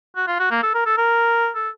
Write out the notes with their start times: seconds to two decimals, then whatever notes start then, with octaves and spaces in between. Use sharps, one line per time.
0.16 F#4
0.28 F4
0.40 F#4
0.51 A#3
0.63 A4
0.75 A#4
0.86 A4
0.97 A#4
1.55 A4